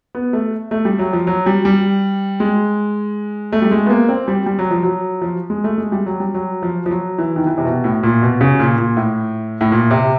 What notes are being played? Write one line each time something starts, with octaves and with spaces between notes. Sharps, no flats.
B3
A3
A3
G3
F#3
F3
F#3
G3
G3
G#3
A3
G3
G#3
B3
A#3
C4
G3
G3
F#3
F3
F#3
F3
G#3
A3
G#3
G3
F#3
G3
F#3
F3
F3
F#3
E3
D#3
E3
C3
B2
A2
A#2
B2
C#3
A#2
A#2
A2
A2
A#2
C3